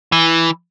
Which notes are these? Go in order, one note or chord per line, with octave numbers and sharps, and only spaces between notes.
E3